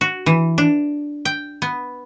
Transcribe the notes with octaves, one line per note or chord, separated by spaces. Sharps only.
F#4
E3
D4
G5
B3